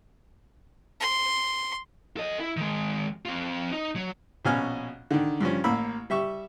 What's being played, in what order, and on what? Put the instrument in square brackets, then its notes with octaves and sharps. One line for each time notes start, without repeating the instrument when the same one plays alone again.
[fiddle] C6
[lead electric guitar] A4 D#5
E4
D#3 G#3
C4 F4
D#4
F#3
[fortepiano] A#1 B2 C#4 G#5 F6
D3 D#3
G2 F3 C#4
A1 A#3 B5 E6
G3 E5 C#6